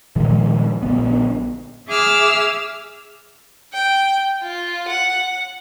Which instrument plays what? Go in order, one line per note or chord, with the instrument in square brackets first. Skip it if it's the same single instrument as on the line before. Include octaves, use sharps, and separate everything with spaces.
[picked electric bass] A#2 D#3 F3 G#3
A#1 D3 B3
[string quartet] G#4 E5 D6 E6 F6
[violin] G5
F4
F#5